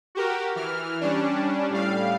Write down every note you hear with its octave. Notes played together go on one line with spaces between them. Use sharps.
F#4 G4 A#4
E3 F6
G3 C#4 D4
A2 G3 F5